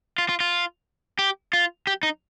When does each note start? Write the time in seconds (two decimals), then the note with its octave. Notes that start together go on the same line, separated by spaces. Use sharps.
0.18 F4
0.29 F4
0.40 F4
1.19 G4
1.53 F4
1.87 G4
2.03 D#4